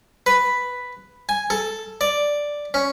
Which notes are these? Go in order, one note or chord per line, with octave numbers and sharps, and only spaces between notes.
B4
G#5
A4
D5
C#4